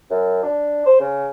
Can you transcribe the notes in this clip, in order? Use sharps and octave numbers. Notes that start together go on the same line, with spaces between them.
F#2
D4
C5
C#3